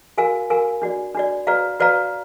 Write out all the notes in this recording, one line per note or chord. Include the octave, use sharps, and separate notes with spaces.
F#4 A#4 F5 G#5
F#4 A#4 F5 G#5
D4 F#4 D5
D4 F#4 D5
F#4 B4 D5 F5 A#5
F#4 B4 D5 F5 A#5